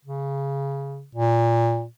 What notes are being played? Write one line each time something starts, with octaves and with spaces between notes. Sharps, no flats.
C#3
A#2